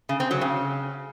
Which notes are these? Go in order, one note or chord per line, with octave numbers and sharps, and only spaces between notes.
C#3
C4
F#3
C#3